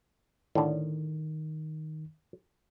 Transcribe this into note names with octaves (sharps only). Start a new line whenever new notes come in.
A2 D3 D#3